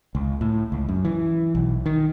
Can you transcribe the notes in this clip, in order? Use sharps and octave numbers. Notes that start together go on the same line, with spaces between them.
C#2
A2
C#2
F#2
E3
B1
D#3